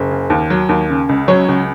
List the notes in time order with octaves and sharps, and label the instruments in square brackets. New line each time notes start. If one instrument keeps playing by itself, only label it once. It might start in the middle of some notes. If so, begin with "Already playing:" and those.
Already playing: [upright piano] F#1
C#3
D#2
F#3
D#2
C#3
C#2
F#3 C#5
C#2